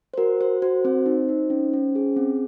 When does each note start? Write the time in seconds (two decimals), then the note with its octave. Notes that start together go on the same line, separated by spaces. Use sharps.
0.14 C5
0.18 F#4 A#4
0.41 F#4 C5
0.62 F#4 C5
0.85 C4 C5
1.06 D#4
1.29 D#4
1.50 C#4
1.73 C#4
1.95 G#4
2.16 C4